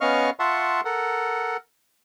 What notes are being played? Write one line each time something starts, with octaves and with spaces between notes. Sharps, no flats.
B3 C#4 D#5 F5 C#6 F6
F4 E5 F#5 A5 C6 C#6
A4 A#4 F#5